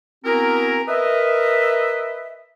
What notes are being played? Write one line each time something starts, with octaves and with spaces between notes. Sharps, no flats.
B3 C4 E4 F#4 G#4 A#4
A#4 B4 D#5 E5